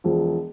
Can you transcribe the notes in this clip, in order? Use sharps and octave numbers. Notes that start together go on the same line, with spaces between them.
E1 F3